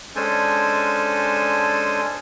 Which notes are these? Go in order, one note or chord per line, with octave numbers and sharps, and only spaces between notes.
G#3 C#4 D4 A4 C5 G#5